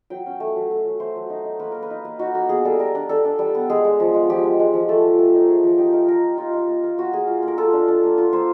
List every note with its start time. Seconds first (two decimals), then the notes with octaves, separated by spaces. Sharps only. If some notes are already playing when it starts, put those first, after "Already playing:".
0.10 F#3 G5
0.26 C#4
0.40 A3
0.56 F#3
0.71 A3
0.85 F#3
1.00 A3 C5
1.16 F#3
1.30 D#4
1.45 D#4
1.60 A#3 B4
1.72 A#3 A#4
1.83 B4
1.90 D#4
2.05 A#3
2.19 D#4 F#4
2.34 A#3 F#4
2.49 B3 G#4
2.64 G3 A4
2.79 G3 A#4
2.95 D4
3.09 D4 A4
3.25 D4
3.39 G3
3.54 B3
3.70 G#3 G#4
3.85 G#3
4.00 F3
4.14 G#3
4.30 F3 G4
4.43 G#3
4.60 G#3
4.74 F3
4.89 A3 A4
5.04 F3
5.18 A3
5.34 D#4
5.48 A3 G#4
5.63 F3
5.78 D#4 G4
5.93 D#4 A#4
6.08 D#4 A#4
6.24 A#3
6.38 D#4 F4
6.53 D#4
6.68 A#3
6.84 A#3
6.98 A#3 F#4
7.13 A#3 G#4
7.27 F4
7.43 A#3
7.48 A#4
7.57 F4 A4
7.73 D4
7.88 D4
8.03 A#3
8.18 F4
8.33 A#3 C5